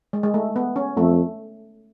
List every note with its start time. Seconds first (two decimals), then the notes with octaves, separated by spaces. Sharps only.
0.13 G#3
0.23 G#3
0.34 A3
0.56 B3
0.76 C#4
0.97 F2 A3